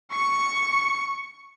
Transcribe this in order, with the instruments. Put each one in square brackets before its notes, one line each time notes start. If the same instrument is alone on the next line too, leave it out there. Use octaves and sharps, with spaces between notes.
[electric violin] C#6 C#7